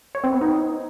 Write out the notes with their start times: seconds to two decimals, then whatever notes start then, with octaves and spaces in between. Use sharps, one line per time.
0.15 C#5
0.24 C4
0.32 B3
0.41 D#4